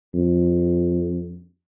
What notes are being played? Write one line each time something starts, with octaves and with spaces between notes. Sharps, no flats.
F2